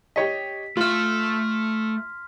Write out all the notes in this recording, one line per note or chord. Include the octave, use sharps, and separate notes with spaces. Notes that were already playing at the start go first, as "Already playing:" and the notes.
G4 C#5 D#5 B6
A3 F4 E5 C6 F6